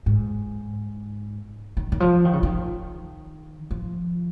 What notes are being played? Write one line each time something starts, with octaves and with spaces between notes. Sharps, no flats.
G#2
D#3
D#3
F3
D#3
C#3
D#3
F3